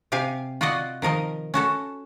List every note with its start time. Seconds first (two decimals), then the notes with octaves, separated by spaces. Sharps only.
0.12 C3 G4 F5 G#5
0.61 F4 F#4 D5 D#5 F#5
1.02 D#3 F3 A#4 D#5
1.54 C#4 F#4 A4